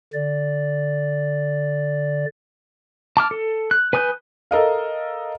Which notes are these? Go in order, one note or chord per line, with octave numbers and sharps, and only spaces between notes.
D3 D5
A5 D6 F6
A4
F#6
B4 G#5 D#6 F#6 G6
A4 A#4 D#5 F5